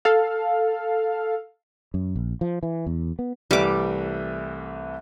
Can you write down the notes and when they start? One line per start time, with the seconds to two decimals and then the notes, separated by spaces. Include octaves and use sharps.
0.05 A4 F5
1.94 F#2
2.16 A#1
2.41 F3
2.63 E3
2.86 E2
3.19 B3
3.51 C2 E3 G3 A3 D6